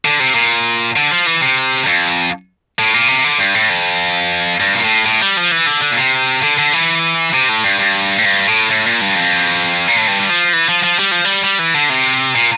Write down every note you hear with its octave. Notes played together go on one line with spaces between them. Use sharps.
D3
C3
A#2
D3
F3
E3
C3
F2
A2
A#2
C3
D3
G2
A2
F2
G2
A#2
A2
A2
G3
F3
E3
D3
D3
A#2
C3
D3
D3
E3
C3
A2
G2
G2
A2
G2
A2
A2
A#2
G2
F2
A#2
A2
G2
G3
F3
E3
F3
F3
G3
F3
G3
G3
E3
D3
C3
A#2